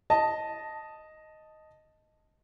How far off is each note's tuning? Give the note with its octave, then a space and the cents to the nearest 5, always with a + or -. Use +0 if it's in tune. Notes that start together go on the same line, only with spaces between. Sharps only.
D#5 +0 A5 +0